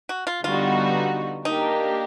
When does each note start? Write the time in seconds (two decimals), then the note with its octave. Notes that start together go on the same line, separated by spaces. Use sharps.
0.09 F#4
0.27 F4
0.43 D3 G3 B3 D#4 F4 F#4
1.45 A#3 D4 D#4 G4 A#4